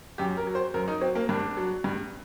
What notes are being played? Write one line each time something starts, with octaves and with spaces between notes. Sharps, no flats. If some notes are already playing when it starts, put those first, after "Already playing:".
F#2 G4
A#4
F#3
C5
F#2 A#4
D#4
F#3 C4
A#3
G2 D4
F#3
G2